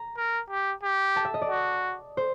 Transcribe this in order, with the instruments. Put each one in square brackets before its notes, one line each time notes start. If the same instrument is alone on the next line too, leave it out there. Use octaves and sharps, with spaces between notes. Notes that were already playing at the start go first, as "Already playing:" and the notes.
Already playing: [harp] A#5
[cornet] A#4
G4
G4
[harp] A5
E5
D#5
D5
[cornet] F#4
[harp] C5